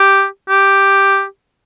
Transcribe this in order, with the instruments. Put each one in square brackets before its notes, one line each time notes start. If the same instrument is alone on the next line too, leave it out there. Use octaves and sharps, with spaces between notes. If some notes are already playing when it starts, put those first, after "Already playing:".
Already playing: [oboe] G4
G4